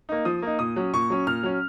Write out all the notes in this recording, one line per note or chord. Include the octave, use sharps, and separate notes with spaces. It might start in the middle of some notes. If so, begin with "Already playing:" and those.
A#3 D#4
F3 D#6
A#3 D#4
A#2 D#6
F#3 C#4
A#2 C#6
F#3 C#4
A#2 F6
F#3 C#4